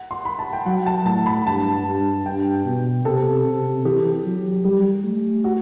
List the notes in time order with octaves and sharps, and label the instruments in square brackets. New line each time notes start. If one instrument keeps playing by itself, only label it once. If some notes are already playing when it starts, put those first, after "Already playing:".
Already playing: [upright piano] F#5
C6
B5
A5
G5
[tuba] F#3 [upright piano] F#5
[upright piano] A5
[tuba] A2 [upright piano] A5
[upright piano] B5
[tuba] G2 [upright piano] A5
[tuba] G2
[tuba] G2 [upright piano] G5
[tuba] B2
[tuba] C3 [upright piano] A4
[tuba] C3
[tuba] E3 [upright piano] G4
[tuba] F#3
[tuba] G3 [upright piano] G4
[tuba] A3
[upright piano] F#4